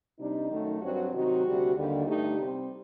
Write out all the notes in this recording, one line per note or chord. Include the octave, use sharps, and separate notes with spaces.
C3 G3 D4 D#4
F#2 D#3 A3
G2 F#3 C4 F#4
C3 D#3 F#3 C4 D#4 F#4
D2 C3 G3
D#2 D3 G3
G2 D3 A3 D#4 G4
C3 G3 C4